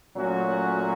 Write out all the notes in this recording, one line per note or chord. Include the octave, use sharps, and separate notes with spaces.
A#2 F#3 A3 C#4 F#4